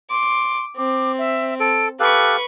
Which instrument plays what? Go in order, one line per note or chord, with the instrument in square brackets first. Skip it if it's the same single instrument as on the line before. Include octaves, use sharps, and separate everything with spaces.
[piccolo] C6 [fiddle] D6
[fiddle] C4 [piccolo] D6
[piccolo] E5
[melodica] A4 [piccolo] D7
[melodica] G4 A4 F5 [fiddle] B4 C#6 [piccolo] F#6